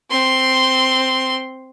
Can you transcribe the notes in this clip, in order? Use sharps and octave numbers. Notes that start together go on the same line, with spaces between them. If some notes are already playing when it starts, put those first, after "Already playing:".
C4 C6